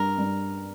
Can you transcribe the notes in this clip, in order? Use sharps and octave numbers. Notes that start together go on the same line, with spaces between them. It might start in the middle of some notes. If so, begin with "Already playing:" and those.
Already playing: G2 A#4
G2